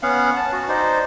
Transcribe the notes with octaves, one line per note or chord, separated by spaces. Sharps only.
B3 C#4 F5 F#5
A5
F#4
D#4 C5 D5